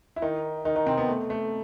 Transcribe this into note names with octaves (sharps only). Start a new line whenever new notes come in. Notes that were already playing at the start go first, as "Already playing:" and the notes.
E4
D#3 D#4
D#3 D#4
D#3 D#4
C3 C4
B3
A3
A3